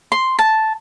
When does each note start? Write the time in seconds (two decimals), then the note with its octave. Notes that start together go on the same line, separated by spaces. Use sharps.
0.12 C6
0.39 A5